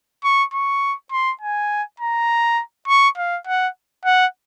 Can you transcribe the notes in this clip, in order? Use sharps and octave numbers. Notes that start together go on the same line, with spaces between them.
C#6
C#6
C6
G#5
A#5
C#6
F5
F#5
F#5